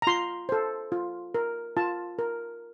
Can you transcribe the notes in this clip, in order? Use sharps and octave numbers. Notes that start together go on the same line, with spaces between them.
A#5
F4 C6
A4 C5
F4
A#4
F4 A5
A#4